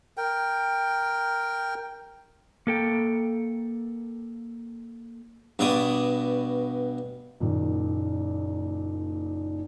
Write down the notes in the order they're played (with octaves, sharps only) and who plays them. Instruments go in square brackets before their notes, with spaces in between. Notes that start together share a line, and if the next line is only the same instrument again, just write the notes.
[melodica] A#4 G5
[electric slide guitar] A#3 A4 G5
[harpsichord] G2 B2 D5 D#6
[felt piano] F#1 A#2 D#3